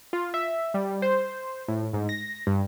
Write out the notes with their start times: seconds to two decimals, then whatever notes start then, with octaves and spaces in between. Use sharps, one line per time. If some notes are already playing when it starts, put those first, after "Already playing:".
0.13 F4
0.34 E5
0.74 G3
1.02 C5
1.68 A2
1.93 G#2
2.09 A#6
2.47 G2